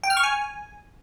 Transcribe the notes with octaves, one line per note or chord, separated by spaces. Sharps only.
G5
F6
C#6
G#5